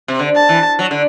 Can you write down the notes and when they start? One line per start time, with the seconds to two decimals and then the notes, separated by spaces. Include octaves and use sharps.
0.08 C3
0.19 D3
0.35 A5
0.49 E3
0.79 F#3
0.91 D3